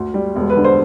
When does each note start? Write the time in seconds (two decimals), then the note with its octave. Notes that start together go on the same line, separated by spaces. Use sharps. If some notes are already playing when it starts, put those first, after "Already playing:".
Already playing: D2
0.14 G3
0.36 E1
0.50 B4
0.57 D3
0.64 C5